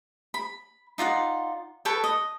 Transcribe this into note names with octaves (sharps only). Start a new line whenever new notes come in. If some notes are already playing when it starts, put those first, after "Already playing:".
B5
D#4 F4 D5 F#5
A4 B4 C#5 G5
D#5